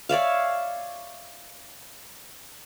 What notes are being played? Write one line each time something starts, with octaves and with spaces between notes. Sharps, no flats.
C#5 D5 E5 F5